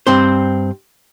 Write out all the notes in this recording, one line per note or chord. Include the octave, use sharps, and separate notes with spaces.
G2 C4 C5